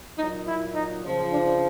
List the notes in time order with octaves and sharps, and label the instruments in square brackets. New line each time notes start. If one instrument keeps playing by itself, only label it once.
[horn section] A#2 D#4
F#3
E4
D#4
C#3 F3
D4